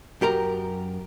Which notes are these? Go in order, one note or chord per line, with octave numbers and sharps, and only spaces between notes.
F#2 G4 A#4 A#5